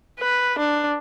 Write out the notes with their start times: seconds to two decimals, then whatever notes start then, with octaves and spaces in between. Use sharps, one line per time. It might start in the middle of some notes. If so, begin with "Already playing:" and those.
0.20 B4
0.58 D4